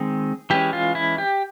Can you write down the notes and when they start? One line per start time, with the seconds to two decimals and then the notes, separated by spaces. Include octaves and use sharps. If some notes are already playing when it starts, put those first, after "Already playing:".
Already playing: D#3 G#3 C4 G#4
0.50 E3 G#3 C#4 G4
0.73 F4
0.95 E4
1.18 G4